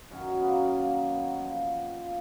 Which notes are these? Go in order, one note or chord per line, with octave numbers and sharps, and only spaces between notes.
F#2 D#3 F#3 C#4
A#3 B3
A#3
B3
A#2 F3
F4